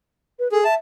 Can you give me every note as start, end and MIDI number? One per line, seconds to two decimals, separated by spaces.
0.39 0.48 71
0.52 0.64 68
0.52 0.60 69
0.64 0.76 76
0.64 0.74 81